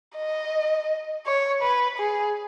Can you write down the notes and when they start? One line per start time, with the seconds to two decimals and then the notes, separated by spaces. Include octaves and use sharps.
0.17 D#5
1.26 C#5
1.62 B4
1.98 G#4